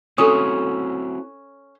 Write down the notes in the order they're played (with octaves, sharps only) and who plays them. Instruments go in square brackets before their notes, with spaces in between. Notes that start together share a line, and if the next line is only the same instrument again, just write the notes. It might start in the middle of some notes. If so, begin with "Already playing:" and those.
[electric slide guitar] C4 E4 F#4 [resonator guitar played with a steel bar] C#4 [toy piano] A4 D#6